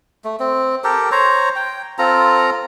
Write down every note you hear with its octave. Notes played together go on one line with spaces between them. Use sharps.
A3
C4
G4 A4 A#4
C5 C#5 A#5
G5
C4 F4 A4 A#5